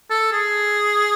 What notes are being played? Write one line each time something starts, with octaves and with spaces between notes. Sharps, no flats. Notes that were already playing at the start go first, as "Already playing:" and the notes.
A4
G#4